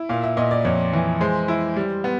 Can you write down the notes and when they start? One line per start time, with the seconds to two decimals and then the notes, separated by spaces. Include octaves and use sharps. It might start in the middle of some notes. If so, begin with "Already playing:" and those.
Already playing: E4
0.09 A#2 F5
0.23 E5
0.37 A#2 D#5
0.51 D5
0.65 F2 C#5
0.93 E3
1.21 G#3 C5
1.48 E4
1.76 G3
2.04 B3